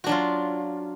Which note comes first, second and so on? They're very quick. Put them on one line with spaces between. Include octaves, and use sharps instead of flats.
F#4 D4 F#3 F4